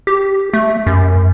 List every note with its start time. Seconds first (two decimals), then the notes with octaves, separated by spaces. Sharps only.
0.07 G4
0.54 A3
0.87 F#2